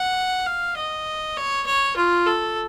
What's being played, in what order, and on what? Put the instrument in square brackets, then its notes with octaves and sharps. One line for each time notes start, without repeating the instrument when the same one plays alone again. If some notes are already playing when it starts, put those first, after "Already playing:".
Already playing: [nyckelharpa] F#5
F5
D#5
C#5
C#5
F4
A4